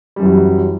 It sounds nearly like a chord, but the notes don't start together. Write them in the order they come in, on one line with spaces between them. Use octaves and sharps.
G3 F#2 E3 F#3